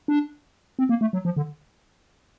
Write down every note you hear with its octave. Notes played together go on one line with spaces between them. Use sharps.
D4
C4
A#3
A3
F#3
F3
D3